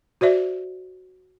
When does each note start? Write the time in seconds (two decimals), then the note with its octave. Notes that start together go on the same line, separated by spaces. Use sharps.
0.21 F#4 C5 D5 E5